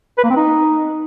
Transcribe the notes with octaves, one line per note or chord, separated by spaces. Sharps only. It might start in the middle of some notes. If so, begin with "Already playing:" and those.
B4
A#3
C4
D#4